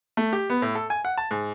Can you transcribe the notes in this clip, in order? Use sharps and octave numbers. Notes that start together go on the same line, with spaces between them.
A3
G4
B3
A2
A4
G#5
F#5
A5
G#2